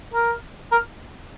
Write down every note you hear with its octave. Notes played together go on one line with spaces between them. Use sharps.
A#4
A#4